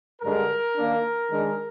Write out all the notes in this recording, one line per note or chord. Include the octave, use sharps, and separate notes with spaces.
G2 D3 G#3 D4 A#4
D#3 A#3 D4
D#3 G#3 D4